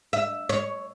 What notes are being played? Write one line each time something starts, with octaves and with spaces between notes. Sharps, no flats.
E5
C#5